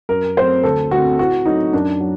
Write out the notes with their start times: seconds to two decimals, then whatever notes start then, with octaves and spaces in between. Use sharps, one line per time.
0.09 F#2 A#4
0.37 F#3 A3 C4 C5
0.64 D2 A4
0.91 D3 A3 C4 F#4
1.18 A2 F#4
1.45 F#3 A3 D#4
1.73 F#2 D4
2.00 F#3